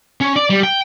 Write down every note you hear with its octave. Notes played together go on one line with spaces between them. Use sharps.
C#4
D5
G3
G5